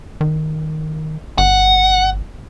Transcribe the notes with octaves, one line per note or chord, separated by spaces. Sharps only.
D#3
G1 F#5